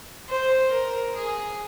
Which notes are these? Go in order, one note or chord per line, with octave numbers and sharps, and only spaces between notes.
C5
A#4
G#4